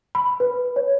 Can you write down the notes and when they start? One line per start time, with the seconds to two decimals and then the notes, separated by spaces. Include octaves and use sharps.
0.15 B5
0.40 B4
0.76 C#5